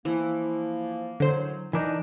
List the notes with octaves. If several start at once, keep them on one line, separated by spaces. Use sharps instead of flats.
E3 F3 A#3
F#2 D3 F#3 C5
E3 D4 D#4 A#4